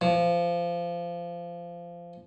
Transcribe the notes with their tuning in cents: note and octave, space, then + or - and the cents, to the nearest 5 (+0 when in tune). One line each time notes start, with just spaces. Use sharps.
F3 -20